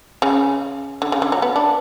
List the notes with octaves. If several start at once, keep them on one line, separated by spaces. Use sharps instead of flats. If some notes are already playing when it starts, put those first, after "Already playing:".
C#3
D3
C#3
D3
F#3
B3
D4